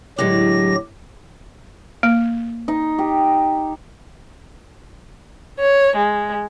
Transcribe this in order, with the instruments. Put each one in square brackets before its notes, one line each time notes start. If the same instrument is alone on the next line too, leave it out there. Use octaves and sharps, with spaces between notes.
[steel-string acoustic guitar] A2 D3 G#3 [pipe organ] F#3 G4 A#6
[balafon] A#3
[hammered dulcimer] D#4
G4
[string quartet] C#5
G#3